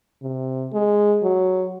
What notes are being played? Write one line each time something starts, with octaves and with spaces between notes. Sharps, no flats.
C3
G#3
F#3